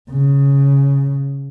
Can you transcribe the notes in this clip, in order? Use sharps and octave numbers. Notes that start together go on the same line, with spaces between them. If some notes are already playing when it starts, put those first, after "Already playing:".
C#3